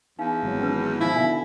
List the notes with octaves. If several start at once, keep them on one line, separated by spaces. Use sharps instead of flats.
E2 D#4 F5
G#1 B2 F#3
C#4 D#4 B4
B2 F3 D#4 E4 F5
B2 D3 D#4 E5 G#5